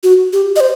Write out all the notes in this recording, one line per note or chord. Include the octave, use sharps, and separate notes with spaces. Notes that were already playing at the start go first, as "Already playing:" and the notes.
F#4
G4
D#5
C5